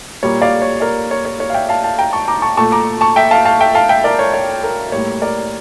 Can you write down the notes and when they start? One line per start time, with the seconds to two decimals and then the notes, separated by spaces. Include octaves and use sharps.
0.23 A#2 G3 A#3 C#5
0.42 D5 F5
0.62 C#5
0.81 A#4 D5
1.11 C#5
1.25 C#5
1.40 C#5
1.50 F5
1.54 E5 G5
1.69 F5 A5
1.84 F5 A5
1.98 G5 A#5
2.13 A5 C#6
2.28 A#5 D6
2.42 A5 C#6
2.57 A#2 A3 A5 C#6
2.72 A#5 D6
3.01 A5 C#6
3.16 E5 G5
3.31 F5 A5
3.45 F5 A5
3.60 E5 G5
3.75 F5 A5
3.89 E5 G5
4.04 A#4 D5
4.19 C#5
4.34 C#5
4.64 A#4
4.92 A2 G3 A#3 C#5
5.22 A#4 D5